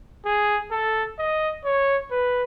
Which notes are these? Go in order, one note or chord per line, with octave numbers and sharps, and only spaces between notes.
G#4
A4
D#5
C#5
B4